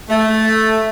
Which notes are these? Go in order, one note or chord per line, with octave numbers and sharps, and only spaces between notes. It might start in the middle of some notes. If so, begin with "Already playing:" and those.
A3